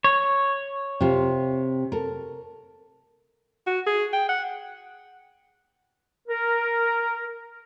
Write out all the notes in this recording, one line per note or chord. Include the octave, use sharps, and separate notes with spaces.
C#5
C3 F4
A4 A#4
F#4
G#4
G5
F#5
A#4